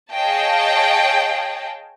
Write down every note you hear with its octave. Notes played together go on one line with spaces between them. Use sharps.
G#4 C#5 D#5 F5 G5 A5